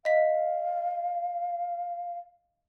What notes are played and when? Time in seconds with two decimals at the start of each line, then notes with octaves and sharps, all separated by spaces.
0.05 D#5 F5 B6